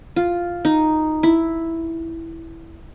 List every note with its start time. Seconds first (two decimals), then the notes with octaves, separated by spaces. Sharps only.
0.16 F4
0.65 D#4
1.23 E4